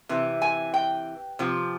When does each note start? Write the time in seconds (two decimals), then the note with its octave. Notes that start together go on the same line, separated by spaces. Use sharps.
0.09 C3 E3
0.42 G#5
0.74 G5
1.39 C3 F3